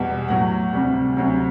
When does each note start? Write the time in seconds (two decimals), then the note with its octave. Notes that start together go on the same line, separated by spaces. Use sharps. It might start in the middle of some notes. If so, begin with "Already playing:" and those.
Already playing: E2 B2 G3
0.28 A2 F#3 F#5
0.73 D2 C3 G3
1.17 D2 C3 F#3